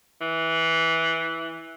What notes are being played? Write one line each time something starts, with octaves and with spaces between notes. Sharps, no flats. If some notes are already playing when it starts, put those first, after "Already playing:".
E3